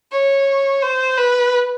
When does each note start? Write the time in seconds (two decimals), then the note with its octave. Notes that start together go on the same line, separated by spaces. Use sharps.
0.12 C#5
0.82 C5
1.17 B4